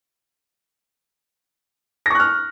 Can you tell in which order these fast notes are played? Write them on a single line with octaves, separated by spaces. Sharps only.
A#6 C#6 F#6 F6